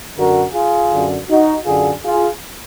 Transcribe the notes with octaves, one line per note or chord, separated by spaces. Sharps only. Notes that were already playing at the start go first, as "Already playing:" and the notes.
F#2 D3 F#4 A#4
F4 G#4
F#2 D3
D#4 F#4
F#2 D3 F4 G#4
F4 G#4